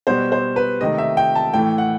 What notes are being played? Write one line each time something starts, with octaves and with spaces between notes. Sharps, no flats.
B2 G3 B3 C5
C5
B4
C3 D#3 A3 D#5
E5
G5
A5
A2 E3 A3 G5
F#5